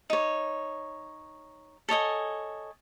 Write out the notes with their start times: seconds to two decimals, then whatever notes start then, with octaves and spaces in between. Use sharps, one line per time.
0.10 D#4 C#5
1.89 A4 C#5 D#5 G#5